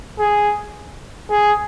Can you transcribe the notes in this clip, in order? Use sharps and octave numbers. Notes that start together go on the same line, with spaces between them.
G#4
G#4